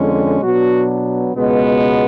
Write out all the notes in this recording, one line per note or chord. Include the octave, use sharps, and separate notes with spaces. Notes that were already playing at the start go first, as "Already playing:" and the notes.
Already playing: F2 D3 G#3 C#4
B2 F#3 B3 D4 F#4
C#2 B2 G#3 B3